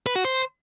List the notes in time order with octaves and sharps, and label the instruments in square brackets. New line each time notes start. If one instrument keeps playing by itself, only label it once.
[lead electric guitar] B4
F#4
C5